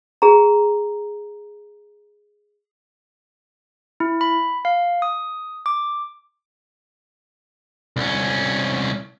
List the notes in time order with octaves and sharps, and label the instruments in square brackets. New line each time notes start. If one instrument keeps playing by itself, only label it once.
[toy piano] G#4 A#5
[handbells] E4
B5
F5
D#6
D6
[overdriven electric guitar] C2 C#4